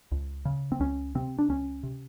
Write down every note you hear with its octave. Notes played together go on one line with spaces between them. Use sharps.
C#2
C#3
C4
C#2 C#4
C3 C4
D4
C#2 C#4
C3